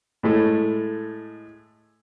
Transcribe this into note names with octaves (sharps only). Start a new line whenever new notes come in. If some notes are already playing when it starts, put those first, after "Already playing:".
A2 G#3 A3